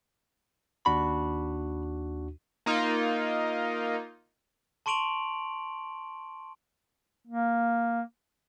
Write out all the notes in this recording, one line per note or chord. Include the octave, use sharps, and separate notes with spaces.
D#2 D4 F#4 B5
A#3 D#4 F4
A5 C6 C#6 D7 F7 F#7
A#3